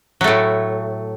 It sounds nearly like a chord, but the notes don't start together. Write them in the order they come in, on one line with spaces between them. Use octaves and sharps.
F#3 A3 A2